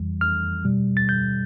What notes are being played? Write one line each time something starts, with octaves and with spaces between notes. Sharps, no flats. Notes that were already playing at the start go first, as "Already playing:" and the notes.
Already playing: F2 E3 G3
F6
B2 G3
A6
G6